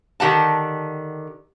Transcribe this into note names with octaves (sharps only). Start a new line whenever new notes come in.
D3 D#3 G4 F#5 A5